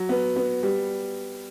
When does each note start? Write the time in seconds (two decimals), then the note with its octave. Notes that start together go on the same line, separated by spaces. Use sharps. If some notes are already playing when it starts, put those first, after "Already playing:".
Already playing: F#3
0.09 B3
0.36 B3
0.63 G3